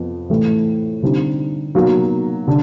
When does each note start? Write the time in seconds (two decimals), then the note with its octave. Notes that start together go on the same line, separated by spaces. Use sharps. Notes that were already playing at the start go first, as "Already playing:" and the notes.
Already playing: F2 B3
0.30 A2 E3 A3
1.02 D3 G3 C4 D#4
1.75 B2 F#3 A#3 D#4
2.48 D3